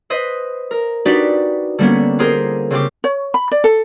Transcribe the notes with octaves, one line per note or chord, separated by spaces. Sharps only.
B4 C5 D#5
A#4
D4 D#4 F#4 G4 B4 D5
D3 G3 A#3 B3 C#4
F4 G4 G#4 A#4 C5
C#3 C4 G4 D6
C#5
B5
D5
A4